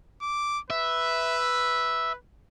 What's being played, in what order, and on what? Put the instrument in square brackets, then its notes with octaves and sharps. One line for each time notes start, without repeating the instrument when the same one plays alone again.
[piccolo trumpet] D6
[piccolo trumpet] B4 [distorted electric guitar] E5